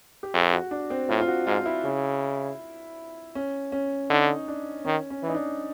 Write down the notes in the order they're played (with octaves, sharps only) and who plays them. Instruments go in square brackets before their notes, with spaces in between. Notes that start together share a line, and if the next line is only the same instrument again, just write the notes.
[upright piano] G4
[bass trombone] F2 [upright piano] G#4
[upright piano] F#4
D4
C4
[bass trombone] A2 [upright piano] F4
[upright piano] F4
F#4
[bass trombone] G#2 [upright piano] F4
[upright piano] E4
[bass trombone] C#3
[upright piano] C#4
C#4
[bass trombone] D3 [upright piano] D#4
[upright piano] D4
[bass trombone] D#3 [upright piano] C#4
[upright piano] C#4
[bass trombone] E3
[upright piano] D#4
D4